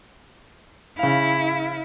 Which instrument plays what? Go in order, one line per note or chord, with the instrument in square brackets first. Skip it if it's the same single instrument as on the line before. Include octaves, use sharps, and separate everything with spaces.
[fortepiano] C#3 F5 [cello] E4